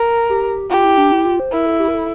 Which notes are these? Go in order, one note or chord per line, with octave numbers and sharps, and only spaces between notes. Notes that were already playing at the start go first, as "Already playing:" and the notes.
Already playing: A#4
G4
F4 G4
E4
D4
E4
F4
C5
E4 A#4
A4
G4
A#4
A4